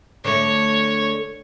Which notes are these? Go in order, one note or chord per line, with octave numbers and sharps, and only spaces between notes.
D3 A3 C#5